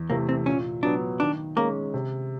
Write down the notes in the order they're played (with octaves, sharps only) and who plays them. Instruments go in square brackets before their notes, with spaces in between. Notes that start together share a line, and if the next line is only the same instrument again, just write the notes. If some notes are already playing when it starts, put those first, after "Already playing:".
Already playing: [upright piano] E2
[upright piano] C3 E3 A3 [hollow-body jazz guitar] A#3
[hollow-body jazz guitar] C4
[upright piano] A#2 [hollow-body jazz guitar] C#4
[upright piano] F#3 B3 [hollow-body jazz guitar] D4
[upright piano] D#3 [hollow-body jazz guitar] D4
[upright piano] G#3 C#4 [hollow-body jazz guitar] A#3
[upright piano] C3